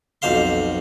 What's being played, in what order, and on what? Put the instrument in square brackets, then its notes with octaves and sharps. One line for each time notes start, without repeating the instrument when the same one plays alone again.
[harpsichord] B1 F2 C5 F5 C6